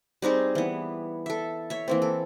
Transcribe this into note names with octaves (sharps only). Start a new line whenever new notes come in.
G3 C4 D#4 G#4
E3 B3
A4 E5
C#5 E5
E3 A#3 C4
A4